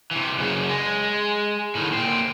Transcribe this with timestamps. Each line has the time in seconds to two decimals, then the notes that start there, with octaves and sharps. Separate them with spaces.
0.11 C3 E3
0.38 F#2 C#3
0.69 G#3
1.75 A2 D#3
1.93 A#2 C4